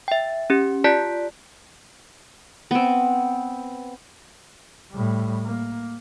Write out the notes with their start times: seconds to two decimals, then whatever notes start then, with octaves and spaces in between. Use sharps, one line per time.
0.08 E5 G5
0.50 C#4 G4
0.84 F4 G4 D5 A5 F#6 B6
2.71 B3 C4
4.92 A2 G3
5.44 A#3